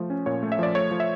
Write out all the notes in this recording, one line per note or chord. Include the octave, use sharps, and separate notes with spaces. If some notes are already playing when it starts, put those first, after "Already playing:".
Already playing: F3 A3
C#4
A#2 C#5
A3
E5
F3 D5
A3 C#5
F3
E5